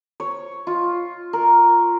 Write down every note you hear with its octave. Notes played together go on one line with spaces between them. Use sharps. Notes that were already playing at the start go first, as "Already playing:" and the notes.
C#5
F4
A#4